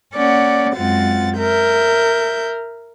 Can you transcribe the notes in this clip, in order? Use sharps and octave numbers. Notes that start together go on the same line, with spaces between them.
A#3 C#4 D5 F#5
F#2 G#3 C4 F4 F#5 A6
A#4 E5 G6